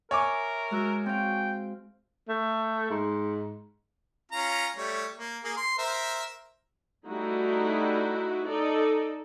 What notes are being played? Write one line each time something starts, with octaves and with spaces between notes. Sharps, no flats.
A#4 C#5 E5 G#5 D6
G#3 F#4 E6
C4 F5 G5
A3
G#2
C#4 F4 A#5
G3 A3 C#5
A#3
A#3 G#4
C6
A#4 C5 E5
G3 A3 D#4 E4 F#4
D#4 A4 D5